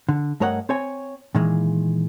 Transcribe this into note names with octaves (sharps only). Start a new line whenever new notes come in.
D3
G2 A3 A#4 C#5 D#5 F#5
C4 C#5 G#5
A#2 D#3 E3 G#3